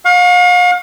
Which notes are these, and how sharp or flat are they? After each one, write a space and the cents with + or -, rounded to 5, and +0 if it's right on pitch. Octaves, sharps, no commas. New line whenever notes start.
F5 +40 C#6 +0